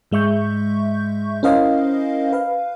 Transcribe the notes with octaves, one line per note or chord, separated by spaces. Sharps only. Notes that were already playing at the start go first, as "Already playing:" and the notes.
G#2 G#3 E5 C#6 G6
C#4 E4 A#4 C5 D#5 F5
B4 F5